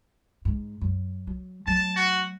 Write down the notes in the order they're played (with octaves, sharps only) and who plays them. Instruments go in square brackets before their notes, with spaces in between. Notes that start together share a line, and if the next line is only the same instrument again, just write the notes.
[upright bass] G#2
F#2
F#3
[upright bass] F#3 A3 [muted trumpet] A5
[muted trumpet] F#4